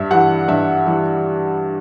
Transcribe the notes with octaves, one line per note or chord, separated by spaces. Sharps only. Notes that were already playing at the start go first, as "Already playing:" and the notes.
Already playing: G2 E5
E3 G3 F#5
G2 E5
E3 G3